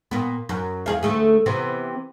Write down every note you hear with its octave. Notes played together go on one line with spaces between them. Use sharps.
A#2 B3
F#2
E2 G#4 F5
D2 A3 G#4
C3 E3 B3